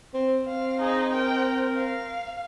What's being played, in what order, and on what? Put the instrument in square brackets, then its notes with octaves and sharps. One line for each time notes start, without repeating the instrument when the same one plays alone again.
[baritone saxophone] C4
[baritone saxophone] C4 [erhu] F5
[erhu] D#4 [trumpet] G#4
[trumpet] A#4 [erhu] G5
[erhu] F5